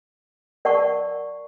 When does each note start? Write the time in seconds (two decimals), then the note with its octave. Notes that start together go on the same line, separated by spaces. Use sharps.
0.65 A#4 D5 F#5 A5 C#6